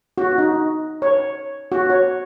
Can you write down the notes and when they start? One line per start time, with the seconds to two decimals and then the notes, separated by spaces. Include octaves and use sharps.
0.18 F#4
0.38 D#4
1.02 C#5
1.72 F#4
1.90 C#5